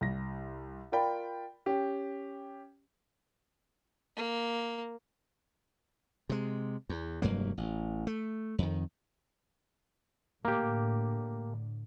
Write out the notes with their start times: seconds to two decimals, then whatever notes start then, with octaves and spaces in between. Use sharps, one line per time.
0.01 C2 A#6
0.92 F4 A#4 D5 G5 B5
1.66 C#4 G4 G5
4.16 A#3
6.29 C3 G#3
6.89 E2
7.22 F1 G2 F#3 A#3
7.58 A1
8.07 A3
8.58 F2 D#3
10.45 A2 D3 A#3 G4